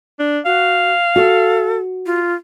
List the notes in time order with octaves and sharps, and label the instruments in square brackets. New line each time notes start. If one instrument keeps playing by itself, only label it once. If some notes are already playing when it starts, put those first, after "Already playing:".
[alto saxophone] D4
[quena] F#4 [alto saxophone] F5
[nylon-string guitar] F#4 [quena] A4
[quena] F4